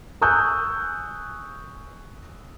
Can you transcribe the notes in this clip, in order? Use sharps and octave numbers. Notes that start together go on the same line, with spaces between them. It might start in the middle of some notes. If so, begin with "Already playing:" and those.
G#5 C#6 D#6 E6 F#6 G6